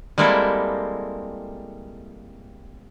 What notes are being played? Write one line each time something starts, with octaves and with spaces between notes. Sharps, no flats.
G3 G#3 A#3 C4 E4 A4